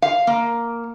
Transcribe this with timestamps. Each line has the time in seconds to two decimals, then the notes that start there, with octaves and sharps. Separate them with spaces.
0.02 F5
0.27 A#3